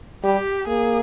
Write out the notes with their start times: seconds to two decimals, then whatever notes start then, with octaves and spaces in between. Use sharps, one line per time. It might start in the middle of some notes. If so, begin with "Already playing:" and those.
0.24 G3 G4
0.68 A#3 G#4